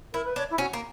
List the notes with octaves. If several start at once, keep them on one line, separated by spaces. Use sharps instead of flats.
E4 A#4
B4
D4 C#5
E4
C#4 F#4
A#3